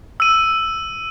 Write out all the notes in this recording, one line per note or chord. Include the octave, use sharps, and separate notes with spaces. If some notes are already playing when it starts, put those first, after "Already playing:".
E6 D#7